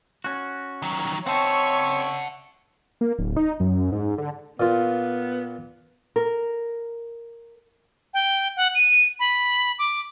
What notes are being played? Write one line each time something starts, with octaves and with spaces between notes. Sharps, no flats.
C#4 F#4
D#3 F#3
C4 D#4 C#5 E5 F#5 A5 C#6
A#3
D1
D#4
F#2
G#2
D3
A#2 B3 F4
A#4
G5
F#5
D#7
B5
D6